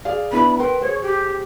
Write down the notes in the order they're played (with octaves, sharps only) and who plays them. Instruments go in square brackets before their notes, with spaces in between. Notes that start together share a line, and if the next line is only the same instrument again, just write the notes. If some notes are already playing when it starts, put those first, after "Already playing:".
[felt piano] G#4 D5 F5
[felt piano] B3 D4 E4 [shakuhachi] B5
[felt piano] A#4 B4 C6 [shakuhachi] G5
[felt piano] G#4 C5 [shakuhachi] C#5
[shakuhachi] G4